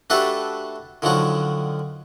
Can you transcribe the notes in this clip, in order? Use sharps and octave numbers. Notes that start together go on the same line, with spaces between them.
A3 D4 F#4 G4 A4 B4
D3 D#3 F3 F#3 F#4